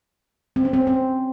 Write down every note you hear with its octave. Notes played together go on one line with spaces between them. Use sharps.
C4
C#4
C4
C4